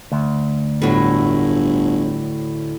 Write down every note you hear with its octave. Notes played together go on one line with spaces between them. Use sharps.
D2
G1 A2 F#3